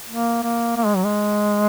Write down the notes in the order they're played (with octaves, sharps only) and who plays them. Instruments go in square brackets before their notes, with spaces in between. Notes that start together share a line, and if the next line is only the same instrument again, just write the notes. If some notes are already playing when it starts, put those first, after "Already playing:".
[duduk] A#3
A#3
A#3
G#3
F#3
G#3